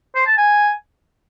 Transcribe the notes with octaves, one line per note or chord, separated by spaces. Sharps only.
C5
A5
G#5